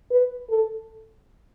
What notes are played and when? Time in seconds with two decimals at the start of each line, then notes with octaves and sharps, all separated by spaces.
0.11 B4
0.50 A4